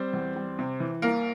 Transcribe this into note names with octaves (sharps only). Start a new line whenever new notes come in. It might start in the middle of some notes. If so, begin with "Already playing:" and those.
Already playing: G3 C4 C5
E2
G3
C3
E3
C2 A#3 A#4